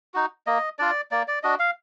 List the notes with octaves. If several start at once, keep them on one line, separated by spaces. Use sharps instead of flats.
D#4 F#4
A#3 D#5
D4 F4 D5
A#3 D5
D5
D4 F#4 D#5
F5